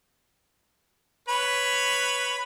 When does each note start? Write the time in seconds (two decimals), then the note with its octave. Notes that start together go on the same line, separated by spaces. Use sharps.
1.29 B4 C#5 B5